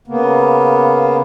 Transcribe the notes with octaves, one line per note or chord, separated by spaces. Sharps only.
C#3 A#3 B3